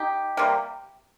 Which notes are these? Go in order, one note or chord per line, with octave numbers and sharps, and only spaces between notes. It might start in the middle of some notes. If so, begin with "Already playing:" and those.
Already playing: D#4 G4
C3 G3 A#3